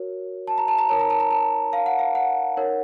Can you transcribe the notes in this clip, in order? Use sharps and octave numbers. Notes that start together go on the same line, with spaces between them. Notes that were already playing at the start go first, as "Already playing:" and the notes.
Already playing: F#4 A#4 C#5
A5
A#5
A5
A#5
D#4 A#4 C#5 A5
A#5
A5
A#5
A5
F5
F#5
F5
F#5
D#4 A#4 C#5